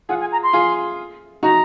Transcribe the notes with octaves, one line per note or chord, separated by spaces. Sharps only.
F4 G#4 F#5
G#5
A#5
C6
F4 G#4
D#4 F#4 A#5